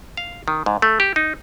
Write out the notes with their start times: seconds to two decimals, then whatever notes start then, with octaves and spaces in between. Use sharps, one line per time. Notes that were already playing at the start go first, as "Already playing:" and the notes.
0.17 F5
0.48 D#3
0.66 G#2
0.82 A3
1.00 G4
1.16 D#4